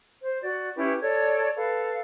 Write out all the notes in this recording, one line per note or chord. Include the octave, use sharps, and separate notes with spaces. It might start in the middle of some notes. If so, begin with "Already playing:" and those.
C5
F#4 D5
C#4 E4 G4 B4
A4 C#5 D5 G#6
A4 B4 F5